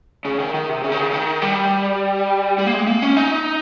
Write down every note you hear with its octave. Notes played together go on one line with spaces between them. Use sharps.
C#3
D#3
D#3
C3
C#3
D#3
C#3
D#3
G3
G3
A#3
G#3
A#3
C#4
D#4